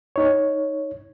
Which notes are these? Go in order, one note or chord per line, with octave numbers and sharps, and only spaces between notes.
D#4 C#5